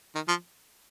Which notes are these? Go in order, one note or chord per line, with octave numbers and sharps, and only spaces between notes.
D#3
F3